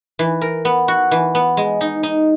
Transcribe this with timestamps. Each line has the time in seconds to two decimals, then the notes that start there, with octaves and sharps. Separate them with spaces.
0.19 E3
0.41 A#4
0.65 B3
0.88 F#4
1.11 E3
1.35 B3
1.57 G#3
1.81 D#4
2.03 D#4